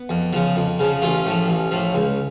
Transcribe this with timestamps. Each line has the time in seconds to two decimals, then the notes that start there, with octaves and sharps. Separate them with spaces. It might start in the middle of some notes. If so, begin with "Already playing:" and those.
Already playing: B3
0.09 F2
0.33 C#3 F3
0.56 F2
0.79 C#3 F3
1.02 A1 C#4 F4
1.25 A2 F3
1.48 A1
1.72 A2 F3
1.94 C#2